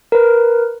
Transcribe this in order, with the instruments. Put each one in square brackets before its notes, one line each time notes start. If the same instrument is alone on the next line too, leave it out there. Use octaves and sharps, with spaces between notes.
[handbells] A#4 B4